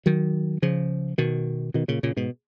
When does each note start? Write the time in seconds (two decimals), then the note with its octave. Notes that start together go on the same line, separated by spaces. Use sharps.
0.06 D#3 F#3
0.62 C#3 F3
1.18 B2 D#3
1.74 B2 D#3
1.88 A#2 C#3
2.03 A#2 C#3
2.17 G#2 B2